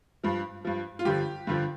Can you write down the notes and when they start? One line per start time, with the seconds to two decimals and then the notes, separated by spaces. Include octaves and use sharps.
0.24 G2 F3
0.65 G2 F3
0.99 F4
1.05 G2 D3 F3 G4
1.47 G2 D3 F3